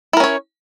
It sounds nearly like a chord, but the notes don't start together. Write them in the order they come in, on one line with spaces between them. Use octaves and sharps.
E4 A#4 C#4 C#5